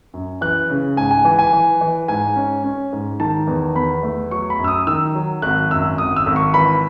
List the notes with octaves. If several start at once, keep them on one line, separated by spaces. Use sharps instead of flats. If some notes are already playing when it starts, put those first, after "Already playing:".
F#2
E3 F#6
C#3
G#2 G#5
G#5
E3 G#5
G#5
E3
E3
G#2 G#5
C#4
C#4
G#2
D#3 A5
E2
E2 B5
A3
F#3 C#6
B5
F#2
E6
D#6
D#3 E6
F#3
G#1 F#6
F#2 E6
G#1 D#6
E6
G#1
C#6
E3 B5